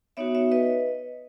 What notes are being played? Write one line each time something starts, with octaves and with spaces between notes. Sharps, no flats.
B3 D#4 F#4 C#5 E5
C#5 E5
B4 D#5